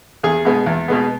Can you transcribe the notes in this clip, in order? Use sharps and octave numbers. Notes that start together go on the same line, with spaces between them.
E2 G#4
B2 G#3 B3
E2
B2 G#3 B3